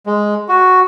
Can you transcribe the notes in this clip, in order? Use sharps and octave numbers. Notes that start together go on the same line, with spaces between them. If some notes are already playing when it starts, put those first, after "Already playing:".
G#3
F#4